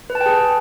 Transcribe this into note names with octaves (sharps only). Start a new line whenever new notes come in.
B4
A5
G5
G#4